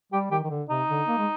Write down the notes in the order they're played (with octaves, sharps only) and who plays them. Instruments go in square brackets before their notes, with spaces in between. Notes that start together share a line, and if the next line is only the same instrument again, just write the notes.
[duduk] G3 [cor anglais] G4
[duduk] D#3 [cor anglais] G4
[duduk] D#3
D3
[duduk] C3 [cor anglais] D#4
[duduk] D3
A#3
G#3